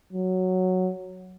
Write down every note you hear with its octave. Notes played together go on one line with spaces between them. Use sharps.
F#3